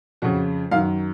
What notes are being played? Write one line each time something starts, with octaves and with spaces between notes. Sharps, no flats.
F2 C#3 F#4
F#2 D#3 F5